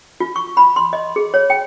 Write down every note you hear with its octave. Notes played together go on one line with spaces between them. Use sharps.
F4
C#6
B5
C6
D#5
G#4
C#5
G5